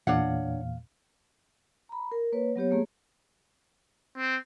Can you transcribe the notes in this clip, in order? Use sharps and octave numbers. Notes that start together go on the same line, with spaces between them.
E2 A#2 D4 C#5 F5 F#5
A#5 B5
A#4
A#3 B4 C#5
F#3 B3 G4 C#5
A3 A#3 G#4
C4